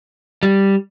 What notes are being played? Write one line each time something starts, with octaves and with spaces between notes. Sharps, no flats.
G3